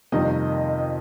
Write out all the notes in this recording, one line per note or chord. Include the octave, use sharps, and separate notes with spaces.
F2 C3 D#3 G3 A#3 D#5